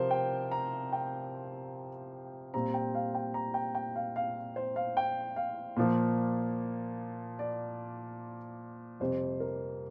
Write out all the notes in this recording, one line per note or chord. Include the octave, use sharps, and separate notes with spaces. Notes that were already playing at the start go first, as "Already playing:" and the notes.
Already playing: C3 F3 C4 A#4 C5
G5
A#5
G5
A#2 G3 C4 A#5
G5
F5
G5
A#5
G5
G5
F5
F5
C5
F5
G5
F5
A#2 F3 A#3
D5
F2 C3 G3 C4 C5
A#4